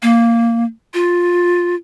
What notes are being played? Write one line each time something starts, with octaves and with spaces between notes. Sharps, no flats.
A#3
F4